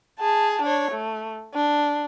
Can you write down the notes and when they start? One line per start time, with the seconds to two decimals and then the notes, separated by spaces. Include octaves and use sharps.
0.20 G#4 A5
0.62 D4 C#5
0.91 A3
1.54 D4